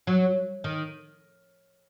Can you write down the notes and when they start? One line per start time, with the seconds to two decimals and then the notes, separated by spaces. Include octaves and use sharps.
0.07 F#3
0.64 D#3